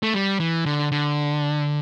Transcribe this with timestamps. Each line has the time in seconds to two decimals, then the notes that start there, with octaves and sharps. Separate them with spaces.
0.03 A3
0.14 G3
0.40 E3
0.66 D3
0.92 D3